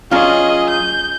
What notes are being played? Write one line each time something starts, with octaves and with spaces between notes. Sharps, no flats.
F#3 C#4 F4 G#4 D#5
G6